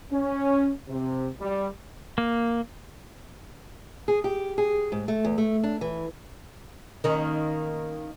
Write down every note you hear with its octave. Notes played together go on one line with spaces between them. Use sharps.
C#4
C3
G3
A#3
G#4
G4
G#4
G#2
A3
E2
A3
D4
E3
D#3 A#3 C#4